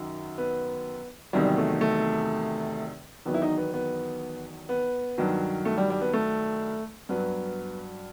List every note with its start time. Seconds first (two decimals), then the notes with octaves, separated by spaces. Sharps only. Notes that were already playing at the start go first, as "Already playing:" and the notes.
Already playing: F#2 D#3 F#3
0.38 B3
1.33 E2 C3 D#3 F#3 G3
1.58 A3
1.81 A3
3.26 E2 D#3 F#3 B3
3.34 E4
3.42 D#4
3.57 B3
3.74 B3
4.69 B3
5.18 G2 D#3 F#3
5.65 A3
5.78 G3
5.90 G3
6.01 B3
6.14 A3
7.09 G2 F#3 B3